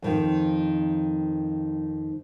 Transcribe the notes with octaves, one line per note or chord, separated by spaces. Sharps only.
F2 D#3 F3